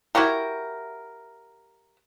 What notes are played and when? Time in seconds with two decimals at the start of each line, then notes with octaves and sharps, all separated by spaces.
0.15 E4 F#4 G4 A#4